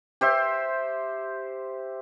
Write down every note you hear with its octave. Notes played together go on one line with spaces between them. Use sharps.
G4 C5 E5